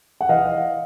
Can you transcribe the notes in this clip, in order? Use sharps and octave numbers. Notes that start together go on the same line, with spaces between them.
F#5
E3 D#5 F5